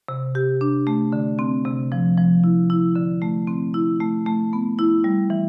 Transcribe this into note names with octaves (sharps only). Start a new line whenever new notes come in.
C3
G4
D4
A3
D3
C4
C3
F3
F3
E4
E4
D3
A3
C4
E4
A3
A3
B3
E4
G3
E3